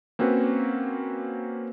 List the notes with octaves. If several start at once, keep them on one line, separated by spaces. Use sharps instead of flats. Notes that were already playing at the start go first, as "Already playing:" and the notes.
A#3 C4 C#4 F#4 B4